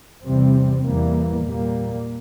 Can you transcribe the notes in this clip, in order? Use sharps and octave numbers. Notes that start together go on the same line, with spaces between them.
E2 C3 G3 C4
E2 E3 G3 A#3
A#2 G3 A#3